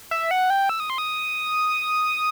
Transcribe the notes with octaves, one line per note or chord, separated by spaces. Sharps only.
E5
F#5
G5
E6
D#6
C6
D#6